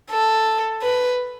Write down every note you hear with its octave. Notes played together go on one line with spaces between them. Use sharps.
A4
B4